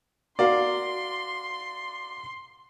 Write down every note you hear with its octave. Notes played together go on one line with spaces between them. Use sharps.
F#4 A#4 D5 F5 C6